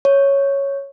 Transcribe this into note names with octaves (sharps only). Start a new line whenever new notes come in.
C#5